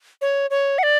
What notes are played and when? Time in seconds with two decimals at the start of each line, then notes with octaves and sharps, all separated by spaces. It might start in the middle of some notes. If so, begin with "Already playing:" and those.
0.21 C#5
0.50 C#5
0.78 F#5
0.83 D5